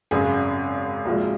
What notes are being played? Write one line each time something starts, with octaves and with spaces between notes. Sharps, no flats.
G#1 F#2 C#3 G#4
C2 A#2 F3 G#3 F#4